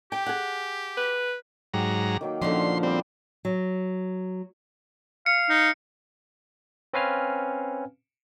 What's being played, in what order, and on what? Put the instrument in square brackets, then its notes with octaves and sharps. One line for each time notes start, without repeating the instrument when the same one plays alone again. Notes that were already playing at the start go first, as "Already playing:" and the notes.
[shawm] G4 [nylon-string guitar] G5
[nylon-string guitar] G#4 F#5
[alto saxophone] B4
[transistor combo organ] G#2 F#3 A#5 [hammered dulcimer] G4
[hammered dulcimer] D#3 F#3 A#3
[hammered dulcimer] A#2 D3 [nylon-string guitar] F3 C#4 D#4 [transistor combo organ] C6
[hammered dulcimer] G3 [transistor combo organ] C4
[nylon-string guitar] F#3
[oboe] F5 [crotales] C#7
[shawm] D#4
[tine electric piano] C4 C#4 B4 F5 G#5 F6